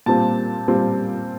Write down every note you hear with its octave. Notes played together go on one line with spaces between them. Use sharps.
A#2 G3 C4 F4 A5
A#2 G3 C4 F4